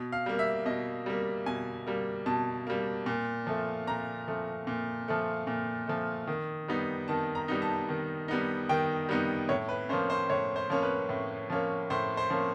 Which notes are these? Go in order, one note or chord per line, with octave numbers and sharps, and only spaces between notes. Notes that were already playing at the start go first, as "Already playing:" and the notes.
Already playing: B2
F5
G3 A#3
E5
B2 D#5
G3 A#3
B2 G#5
G3 A#3
B2 A5
G3 A#3
A#2
F3 A3
A#2 A#5
F3 A3
A#2
F3 A3
A#2
F3 A3
D#3
G3 B3 D#4
D#3 A5
A#5
G3 B3 D#4
A5
D#3
G3 B3 D#4
D#3 G5
G3 B3 D#4
A2 C#5
B4
F3 A#3 C#4 C5
C5
A2 C#5
C5
F3 A#3 C#4
B4
A2
F3 A#3 C#4
A2 C5
C5
F3 A#3 C#4